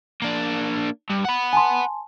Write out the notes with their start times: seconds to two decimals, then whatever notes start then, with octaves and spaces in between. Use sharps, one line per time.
0.22 A#3 D4
1.10 G2
1.25 F#5 B5
1.53 G#5 A5 C6